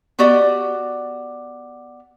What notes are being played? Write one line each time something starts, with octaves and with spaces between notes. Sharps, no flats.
B3 F#4 G4 D5 D#5